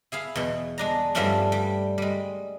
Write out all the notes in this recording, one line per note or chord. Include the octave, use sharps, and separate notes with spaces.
E4 G#4 F5
E2 B2
G#3 D4 A#5
G2 F3 G3 A3 C#4 D4
G3
G3 G#3